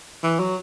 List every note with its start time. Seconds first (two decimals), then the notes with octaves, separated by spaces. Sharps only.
0.23 E3
0.39 F#3